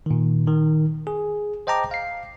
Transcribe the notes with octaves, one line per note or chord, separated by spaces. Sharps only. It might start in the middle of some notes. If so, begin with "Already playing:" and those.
A#2 D#3
D#3
G#4
C5 D#5 G5 A5 A#5 D6
F5 C7